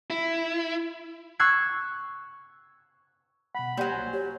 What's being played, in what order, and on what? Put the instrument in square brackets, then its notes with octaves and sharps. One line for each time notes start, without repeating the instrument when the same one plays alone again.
[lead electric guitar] E4
[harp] C#6 E6 F#6 G#6 C7
[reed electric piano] B2 F#5 [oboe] B5
[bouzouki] F#3 G3 [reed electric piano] A#3 G4 F#5 [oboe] C5
[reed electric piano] C2 G#5
[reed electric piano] G4 [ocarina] C#5